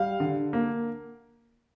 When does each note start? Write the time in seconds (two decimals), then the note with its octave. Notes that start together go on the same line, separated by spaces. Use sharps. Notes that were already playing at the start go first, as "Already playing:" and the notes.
Already playing: G3 F5
0.20 D3
0.53 A#3